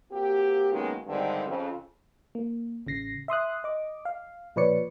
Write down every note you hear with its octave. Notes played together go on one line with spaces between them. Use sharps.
A#3 C4 F#4 G4
D#3 F#3 G#3 A#3 B3 C#4
G2 D3 D#3 G3 G#3 C4
F2 C#3
A#3
A1 C#3 A#6 C7
E5 C6 D#6 F#6
D#5 D6
F5
A#2 F3 B4 C#5 D5 C#7